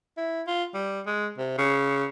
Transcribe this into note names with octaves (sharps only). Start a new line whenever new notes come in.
E4
F4
G3
G#3
C3
C#3